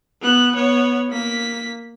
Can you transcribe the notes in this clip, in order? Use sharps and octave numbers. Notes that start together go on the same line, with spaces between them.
B3 F#6
B3 C#5
A#3 B6